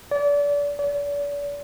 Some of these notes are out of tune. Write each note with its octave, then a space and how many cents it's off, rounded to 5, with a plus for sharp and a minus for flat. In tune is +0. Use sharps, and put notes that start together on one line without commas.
D5 -30
D5 -40